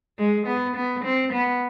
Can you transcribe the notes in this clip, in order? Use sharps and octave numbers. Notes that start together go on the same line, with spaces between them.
G#3
B3
B3
C4
B3